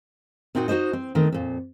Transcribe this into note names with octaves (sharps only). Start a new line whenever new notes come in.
A#2 C4 D#4 F#4 G5
D#4 F#4 B4 C5 D#5
C4
D#3 A3 B3 C4
F2 A#2